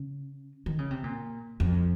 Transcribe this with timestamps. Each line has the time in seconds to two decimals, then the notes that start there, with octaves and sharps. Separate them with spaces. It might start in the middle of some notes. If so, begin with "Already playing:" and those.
Already playing: C#3
0.66 D#3
0.78 C#3
0.91 C3
1.04 A#2
1.60 F2